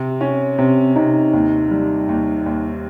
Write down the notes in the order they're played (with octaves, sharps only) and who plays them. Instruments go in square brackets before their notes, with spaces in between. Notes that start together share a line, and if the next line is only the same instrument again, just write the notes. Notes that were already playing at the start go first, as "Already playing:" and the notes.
Already playing: [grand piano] C3
C#4
[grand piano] C3 [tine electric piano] C4
[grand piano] C3 [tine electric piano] D#4
[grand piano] D#2
G3
D#2
D#2